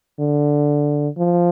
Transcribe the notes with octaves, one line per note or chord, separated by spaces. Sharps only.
D3
F3